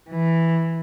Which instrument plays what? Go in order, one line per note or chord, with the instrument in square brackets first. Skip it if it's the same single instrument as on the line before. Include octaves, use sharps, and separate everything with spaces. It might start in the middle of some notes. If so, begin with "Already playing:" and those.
[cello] E3